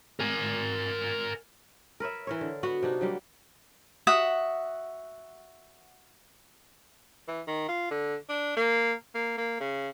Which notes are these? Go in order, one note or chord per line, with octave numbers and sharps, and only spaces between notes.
A#4 G#5
A#4 B4 C#5 E5
E3 A#4 C#5
D3
B3 F#4
C3 D4 D#4
D3 F#3 G3 A#3
F#4 E5 F#5 D#6
E3
D#3
F4
D3
D4
A#3
A#3
A#3
C#3